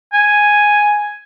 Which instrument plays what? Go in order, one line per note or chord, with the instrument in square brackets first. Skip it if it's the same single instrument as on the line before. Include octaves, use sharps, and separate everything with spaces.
[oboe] G#5